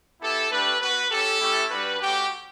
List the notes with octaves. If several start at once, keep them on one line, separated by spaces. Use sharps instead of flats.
B3 E4 G4 A4
A3 D4 G4 B4
B3 F#4 B4
C#4 G4 A4
A3 C#4 E4 G4
G3 D4 F#4 B4
A3 C#4 F#4 G4